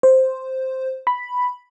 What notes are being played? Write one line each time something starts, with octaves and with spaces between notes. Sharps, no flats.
C5
B5